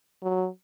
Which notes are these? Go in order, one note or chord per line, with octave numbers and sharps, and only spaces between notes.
F#3